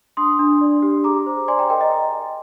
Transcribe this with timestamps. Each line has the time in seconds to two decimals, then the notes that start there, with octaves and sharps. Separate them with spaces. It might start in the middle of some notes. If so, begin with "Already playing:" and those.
0.17 D4 C6 D#6
0.39 D4
0.61 D5
0.82 G4
1.04 G#4 A#5 D6
1.26 C5
1.48 D5 G#5 C6
1.59 G5 A#5
1.70 A#4 D#5 G5
1.81 D#5